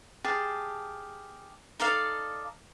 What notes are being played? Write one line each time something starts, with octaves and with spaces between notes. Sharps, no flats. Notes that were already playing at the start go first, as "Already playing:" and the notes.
G4 G#4 F5 A5
D#4 A4 D5 F5